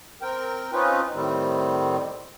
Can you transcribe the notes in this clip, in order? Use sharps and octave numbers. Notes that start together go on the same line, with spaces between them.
C4 A#4 G5
C4 C#4 D#4 F4 B4
A2 D#3 G3 C4